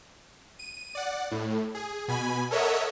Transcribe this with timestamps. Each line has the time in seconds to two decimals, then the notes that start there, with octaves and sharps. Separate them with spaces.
0.59 D#7
0.95 D5 F#5
1.31 A2
1.75 G#4
2.08 B2 G#5 B5
2.51 A4 A#4 C#5 D#5 E5 F#5